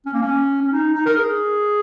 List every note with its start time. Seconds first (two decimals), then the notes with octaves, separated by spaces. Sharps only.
0.06 C#4
0.13 A#3
0.22 C#4
0.62 C#4
0.72 D#4
0.94 D#4
1.06 A#4
1.17 G#4